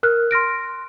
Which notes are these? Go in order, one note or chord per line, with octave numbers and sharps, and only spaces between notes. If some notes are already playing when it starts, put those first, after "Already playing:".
A#4 F6 F#6
C6 F6 A#6 D7